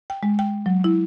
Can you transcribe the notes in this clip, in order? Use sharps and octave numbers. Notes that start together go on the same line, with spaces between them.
G5
G#3
G5
F#3
E4